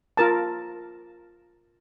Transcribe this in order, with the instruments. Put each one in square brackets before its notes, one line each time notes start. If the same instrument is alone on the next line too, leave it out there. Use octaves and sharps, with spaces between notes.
[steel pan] F4 A#4 A5